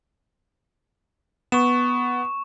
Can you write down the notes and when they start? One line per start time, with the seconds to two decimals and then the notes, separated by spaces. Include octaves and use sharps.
1.52 B3 C#6 E7